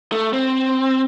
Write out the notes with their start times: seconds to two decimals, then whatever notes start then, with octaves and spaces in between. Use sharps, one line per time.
0.12 A3
0.33 C4